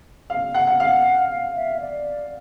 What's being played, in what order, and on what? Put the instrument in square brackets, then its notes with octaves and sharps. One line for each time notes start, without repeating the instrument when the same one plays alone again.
[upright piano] F5
F#5
F#5
[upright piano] F5 [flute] F#5
[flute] F5
E5
D5